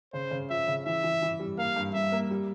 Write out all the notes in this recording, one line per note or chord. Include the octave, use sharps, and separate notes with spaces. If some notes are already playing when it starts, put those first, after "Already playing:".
C#3 C5
C#3
F3 E5
C#3
E3 E5
E3
E3
G3
A#3 F5
G2
G2 E5
A#3
G3